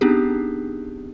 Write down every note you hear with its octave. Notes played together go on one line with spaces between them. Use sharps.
B3 C4 D4 D#4 G4 G#4